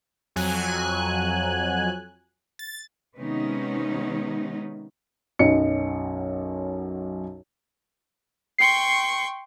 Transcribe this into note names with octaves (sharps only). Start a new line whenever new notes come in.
F2 F#3 G#5 F#6
A6
C3 D#3 G#3 B3 C#4 D#4
B1 F#2 D#5 C#7
G5 C6 C#6 C7 C#7